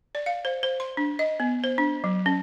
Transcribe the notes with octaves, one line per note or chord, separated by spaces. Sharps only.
D5
F5
C5
C5
C6
D4
D#5
B3
C5
D4
F#3
C#4